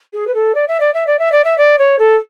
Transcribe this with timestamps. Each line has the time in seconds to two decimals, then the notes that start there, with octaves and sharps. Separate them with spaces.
0.13 G#4
0.27 B4
0.34 A4
0.55 D5
0.68 E5
0.80 D5
0.94 E5
1.07 D5
1.19 E5
1.32 D5
1.44 E5
1.58 D5
1.78 C#5
1.99 A4